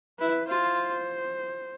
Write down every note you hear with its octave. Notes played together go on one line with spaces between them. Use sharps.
E4 B4
F4 C5